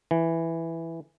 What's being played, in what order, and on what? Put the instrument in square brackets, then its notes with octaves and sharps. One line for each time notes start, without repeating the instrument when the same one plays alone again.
[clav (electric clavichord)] E3